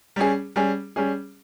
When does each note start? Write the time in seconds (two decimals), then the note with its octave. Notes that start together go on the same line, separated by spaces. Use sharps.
0.16 G3 C#4 G#4
0.56 G3 C#4 G#4
0.96 G3 C#4 G#4